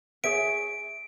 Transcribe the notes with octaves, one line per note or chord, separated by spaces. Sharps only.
G#4 C#5 E5 D7